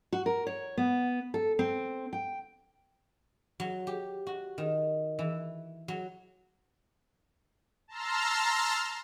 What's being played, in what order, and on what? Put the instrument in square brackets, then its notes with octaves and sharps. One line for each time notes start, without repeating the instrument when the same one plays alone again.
[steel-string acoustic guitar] F#4
A#4
C#5
B3
A4
C4
G5
[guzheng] F#3
G4
F#4
D#3
E3
F#3
[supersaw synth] A5 A#5 C6 E6 F6